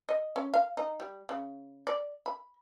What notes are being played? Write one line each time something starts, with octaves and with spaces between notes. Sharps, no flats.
D#5
C#4
F5
D#4
G3
C#3
D5
B5